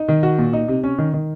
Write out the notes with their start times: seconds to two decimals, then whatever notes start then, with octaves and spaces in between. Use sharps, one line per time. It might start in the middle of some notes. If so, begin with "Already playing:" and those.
Already playing: D#4
0.08 D#3
0.23 F#4
0.38 A#2
0.53 D#4
0.68 C3
0.84 C#4
0.98 D#3
1.13 D#3